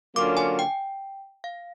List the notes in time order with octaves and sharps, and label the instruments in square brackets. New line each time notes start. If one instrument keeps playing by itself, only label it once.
[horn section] D3 F#3 A#3 C#4 F4 [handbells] D6
[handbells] G#5
G5
F5